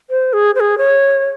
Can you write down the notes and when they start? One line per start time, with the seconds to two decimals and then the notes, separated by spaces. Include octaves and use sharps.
0.10 C5
0.33 G#4
0.55 C5
0.60 G#4
0.78 C#5